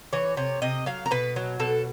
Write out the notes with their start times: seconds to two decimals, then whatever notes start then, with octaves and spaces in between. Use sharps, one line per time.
0.13 E3 C#5
0.37 C3 C#5
0.62 C3 D#5
0.86 F#3 F5
1.06 A#4
1.11 B2 B4
1.36 F#3
1.60 B2 A4